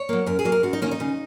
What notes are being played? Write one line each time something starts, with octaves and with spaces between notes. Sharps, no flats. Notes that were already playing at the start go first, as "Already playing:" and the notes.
Already playing: C#5
F#3 A#3
F#2 A#4
G#4
F#3 A#3
A#4
F#2 F#4
D#4
D#3 A#3 C#4
D#4
C#3